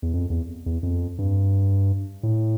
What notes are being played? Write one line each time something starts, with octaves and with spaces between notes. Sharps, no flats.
E2
F2
E2
E2
F2
G2
A2